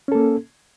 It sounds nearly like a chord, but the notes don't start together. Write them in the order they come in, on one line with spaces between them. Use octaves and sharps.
C#4 A4 A#3